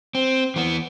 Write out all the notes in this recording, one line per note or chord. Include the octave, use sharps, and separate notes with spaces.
C4
E3 B3